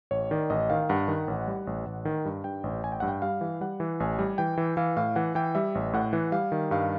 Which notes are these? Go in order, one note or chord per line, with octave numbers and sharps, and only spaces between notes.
A1 C#5
D#3 D5
A1 D#5
D#3 F5
G2 F#5
D#3
A1
G3
A1
A1
D#3
G2
G2 G5
A1
A1 G#5
G5
G2 F#5
G5
G3 F5
E3
G3 F#5
E3
A1 G#5
G3
E3 G5
E3
E3 F5
A2 F5
E3 F#5
E3 G5
G3 E5
A1
A2 F#5
E3
G3 F5
D#3
G2 F5